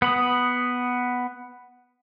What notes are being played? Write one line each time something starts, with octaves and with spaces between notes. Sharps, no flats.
B3 B5 D#6